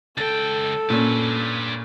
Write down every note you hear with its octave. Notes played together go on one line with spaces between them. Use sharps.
C#2 A4 G5 A6
A#2 C#4 D4 B4